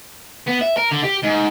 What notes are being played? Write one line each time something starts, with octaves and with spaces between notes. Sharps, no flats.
B3
E5
A#4
D3
G4
G#2